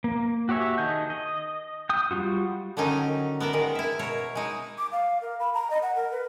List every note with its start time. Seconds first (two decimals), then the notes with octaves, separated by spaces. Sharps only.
0.04 A#3
0.49 F#4 G4 C#5 E5 G#5
0.78 D#3 G#4 D#5 A5 G6
1.10 D#5
1.89 G5 D#6
2.11 G3 D4 F4 F#4
2.77 D3 D#3 F#3 C#4 D#4
3.40 B3 A#4 D5 E5
3.53 D#3 G#3 A#4
3.75 E4 E5
3.99 B2 A#4 C#5
4.35 G#3 D#4 E4
4.78 D6
4.92 F5
5.22 A#4
5.40 B5
5.54 A#5
5.70 D#5
5.82 F#5
5.95 A#4
6.12 B4